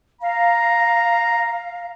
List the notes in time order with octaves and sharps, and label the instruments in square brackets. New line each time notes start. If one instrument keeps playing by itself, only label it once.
[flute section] F5 [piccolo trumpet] A#5